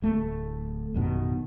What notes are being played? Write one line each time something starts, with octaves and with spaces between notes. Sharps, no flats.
D1 A3
A1 F#2 B2 D#3